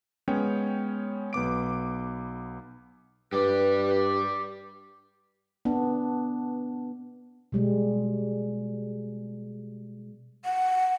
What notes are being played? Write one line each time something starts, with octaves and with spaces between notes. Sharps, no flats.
G#3 B3 C#4 C#5 G5
B1 B3 D6 D7
G2 G4 B4 D5
B3 D4
B2 G3 G#3
F#5